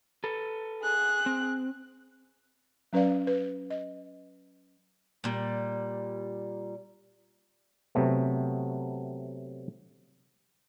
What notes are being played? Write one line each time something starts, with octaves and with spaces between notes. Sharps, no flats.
A4 B4
G#4 F#6
C4
F#3 C#4 B4 D5 F5
B4
D#5
A#2 G3
C3 F#3 A3 B3